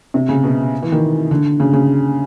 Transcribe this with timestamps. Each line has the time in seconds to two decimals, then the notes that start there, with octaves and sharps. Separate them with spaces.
0.14 C3
0.29 C#3
0.44 B2
0.83 E3
0.92 D#3
1.31 D3
1.60 C#3
1.73 C#3